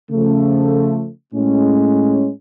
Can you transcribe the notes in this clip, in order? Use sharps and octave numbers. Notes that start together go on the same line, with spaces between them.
C#3 F3 A3
A2 G#3 C#4